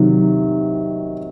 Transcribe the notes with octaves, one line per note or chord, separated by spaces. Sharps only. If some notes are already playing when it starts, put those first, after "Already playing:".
Already playing: C3 D#3 F#3